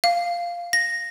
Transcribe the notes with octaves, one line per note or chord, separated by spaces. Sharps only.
F5
A#6